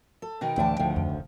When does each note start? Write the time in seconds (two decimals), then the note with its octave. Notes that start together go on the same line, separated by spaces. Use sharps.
0.22 A4
0.41 B2 D#3 D#4 G5
0.58 D2 A2 E3 A5
0.79 D2 A2 D#3 F3
0.96 F2
1.09 F1